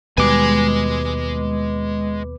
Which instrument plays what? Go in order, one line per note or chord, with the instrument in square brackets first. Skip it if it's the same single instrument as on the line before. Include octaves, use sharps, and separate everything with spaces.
[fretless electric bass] D#2 B2 G3 [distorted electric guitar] G#3 G#5 [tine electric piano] B4 D6